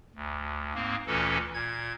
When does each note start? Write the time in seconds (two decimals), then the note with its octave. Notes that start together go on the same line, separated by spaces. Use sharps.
0.15 D2
0.74 G#2 A#3 C4
1.07 D2 A#2 E3 C#4 A4
1.54 A#2 G#6